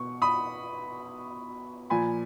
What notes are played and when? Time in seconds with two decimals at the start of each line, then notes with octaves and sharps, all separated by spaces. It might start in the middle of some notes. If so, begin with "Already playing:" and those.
Already playing: B2 C#6
0.22 B5 D#6
1.90 A#2 F3 G#5 B5